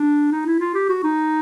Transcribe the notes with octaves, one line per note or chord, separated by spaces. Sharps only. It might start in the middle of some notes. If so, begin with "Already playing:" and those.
Already playing: D4
D#4
E4
F4
G4
F#4
D#4